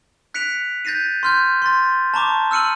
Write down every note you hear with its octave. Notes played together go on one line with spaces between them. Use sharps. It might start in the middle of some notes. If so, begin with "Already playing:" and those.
F#6 B6 C#7 D7 F7
G6 A6 A#6 C7 D#7
C6 F6 G6
C6 A6
A5 A#5 C#6 D6
E6 F6 C#7 D#7 F#7